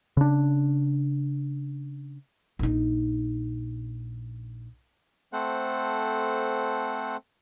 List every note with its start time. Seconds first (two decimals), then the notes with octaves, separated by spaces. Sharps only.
0.17 C#3 D4
2.59 A#1 D#4
5.33 A3 C4 A4 C5 F#5